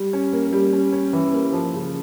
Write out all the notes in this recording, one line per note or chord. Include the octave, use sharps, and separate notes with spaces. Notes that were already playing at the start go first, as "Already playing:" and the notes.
Already playing: G3
C#4
A#3
G3
C#4
C#4
E3
A#3
F3
C#3